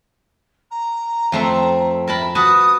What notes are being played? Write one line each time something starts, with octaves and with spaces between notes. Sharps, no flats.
A#5
F2 A3 C4
A#4 A5 B5
F#4 B4 A5 D#6